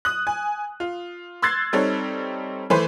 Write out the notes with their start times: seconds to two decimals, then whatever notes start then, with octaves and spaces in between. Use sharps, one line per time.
0.05 D#6 F#6
0.27 G#5
0.80 F4
1.42 C6 E6 F#6 G#6 A6 C7
1.73 G3 C4 D#4 A4 C#5
2.70 E3 A3 B4 C5